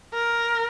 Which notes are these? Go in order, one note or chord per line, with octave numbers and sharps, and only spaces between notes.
A#4